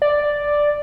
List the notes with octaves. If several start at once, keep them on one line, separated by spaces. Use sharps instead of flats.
D5